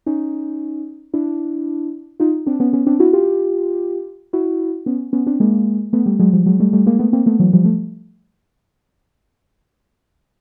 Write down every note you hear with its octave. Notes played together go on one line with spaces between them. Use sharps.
C#4 D#4
D4 E4
D#4 F4
C4 D4
B3 C#4
B3 C#4
C4 D4
E4 F#4
F4 G4
E4 F#4
B3 C#4
B3 C#4
C4 D4
G#3 A#3
A3 B3
G3 A3
F#3 G#3
F3 G3
F#3 G#3
G3 A3
G3 A3
G#3 A#3
A3 B3
A#3 C4
A3 B3
E3 F#3
F3 G3
A3